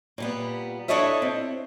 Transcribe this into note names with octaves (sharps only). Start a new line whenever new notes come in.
A#2 G3 B3
D4 E4 A4 C#5 D#5 E5
C4